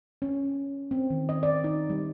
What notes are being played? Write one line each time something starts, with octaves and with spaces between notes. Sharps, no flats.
C#4
C4
D#3
D#5
D5
D#4
G3